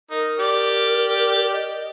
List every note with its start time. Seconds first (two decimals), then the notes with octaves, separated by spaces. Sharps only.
0.10 D#4 A#4
0.39 G4 D5
1.51 D#5